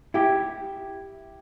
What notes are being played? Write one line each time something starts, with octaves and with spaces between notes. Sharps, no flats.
E4 G4